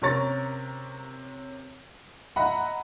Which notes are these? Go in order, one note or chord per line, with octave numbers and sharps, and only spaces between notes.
C3 C#4 A#4 C#6 A6
D#5 E5 F#5 A#5 B5